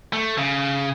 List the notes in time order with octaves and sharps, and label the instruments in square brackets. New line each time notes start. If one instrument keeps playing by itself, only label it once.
[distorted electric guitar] A3
C#3